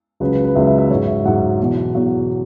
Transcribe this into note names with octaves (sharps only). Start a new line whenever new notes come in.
C#2 C#3 F#3 B4
B4
B4
C#2 C#3 F#3 E5
E5
E5
G#2 F#3 C#5
E5
G#2 F#3 F#5
E2 B2 F#3
E2 B2 F#3